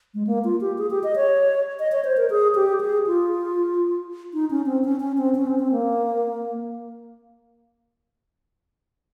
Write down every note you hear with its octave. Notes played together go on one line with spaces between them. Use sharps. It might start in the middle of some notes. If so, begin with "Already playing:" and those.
G#3
A#3
F4
G4
G#4
G4
D#5
C#5
D#5
C#5
C5
A#4
G#4
G4
G#4
F4
D#4
C#4
C4
C#4
C#4
C4
C#4
C4
C4
A#3